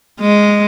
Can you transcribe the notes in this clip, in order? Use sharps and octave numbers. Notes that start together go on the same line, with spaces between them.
G#3